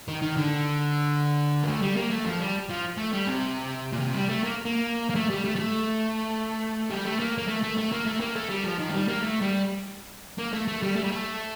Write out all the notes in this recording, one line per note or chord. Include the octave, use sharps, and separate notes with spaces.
D#3
D#3
D3
A#3
A3
G3
A#3
A3
F3
G3
F3
A3
G3
C3
A#2
C3
G3
A3
A#3
A#3
A#3
A3
G3
A3
G3
A3
G3
A3
A#3
A#3
A3
A3
A3
A#3
A3
A#3
A3
G3
F3
D#3
A3
G3
A#3
A3
G3
A#3
A3
A3
G3
A3
G3
A3